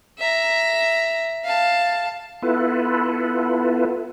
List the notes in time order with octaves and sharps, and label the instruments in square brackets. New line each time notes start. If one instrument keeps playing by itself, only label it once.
[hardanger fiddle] E5 A#5
F5 A5
[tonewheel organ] B3 E4 F4 A4 B4